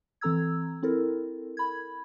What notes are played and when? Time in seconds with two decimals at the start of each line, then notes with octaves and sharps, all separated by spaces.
0.21 E3 C4 A4 A#5 E6 G#6
0.83 C4 E4 A4 A#4
1.57 B5 G#6